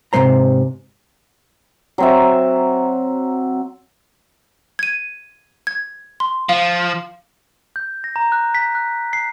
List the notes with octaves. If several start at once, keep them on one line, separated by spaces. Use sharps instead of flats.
G#2 C3 E3 A3 C5 A#5
F#3 C4 E5
G#6 D#7
G#6
C6
F3 F5
G6
A#6
A#5
F#6
B6
F#6
C7